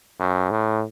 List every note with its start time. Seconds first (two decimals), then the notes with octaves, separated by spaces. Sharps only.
0.20 F#2
0.51 A2